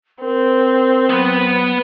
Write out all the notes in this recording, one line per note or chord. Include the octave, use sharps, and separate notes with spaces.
C4 A#4
F#3 B3 B4